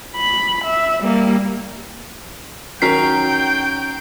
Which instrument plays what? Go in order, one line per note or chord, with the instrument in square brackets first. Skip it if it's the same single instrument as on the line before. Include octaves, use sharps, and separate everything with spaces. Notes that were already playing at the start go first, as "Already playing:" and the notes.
[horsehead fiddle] B5
E5
G3 A#3
[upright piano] D#3 C#4 C#5 [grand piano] F#3 A#4 B6 [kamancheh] G5 [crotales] C7